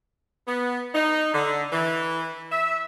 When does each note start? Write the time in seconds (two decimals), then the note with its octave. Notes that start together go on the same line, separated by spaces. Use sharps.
0.46 B3
0.95 D#4
1.34 D3
1.72 E3
2.51 E5